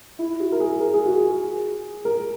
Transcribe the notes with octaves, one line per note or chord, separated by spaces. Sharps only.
E4
F#4
A#4
G#4
A#4
G#4
F#4
G#4
A#4